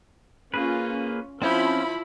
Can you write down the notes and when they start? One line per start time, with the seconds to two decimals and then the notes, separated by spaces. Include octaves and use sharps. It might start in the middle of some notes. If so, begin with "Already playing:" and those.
0.54 A#3 C#4 F4 G#4 B4
1.42 F3 C4 C#4 E4 G5 B5